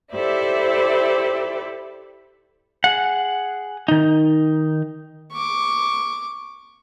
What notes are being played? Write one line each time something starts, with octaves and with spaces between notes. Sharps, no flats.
E4 G4 A4 C5 D5 E5
G#4 F#5
D#3 D#4
C#6 D6